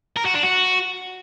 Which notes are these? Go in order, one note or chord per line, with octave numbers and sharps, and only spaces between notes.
A#4
F#4
D4
F#4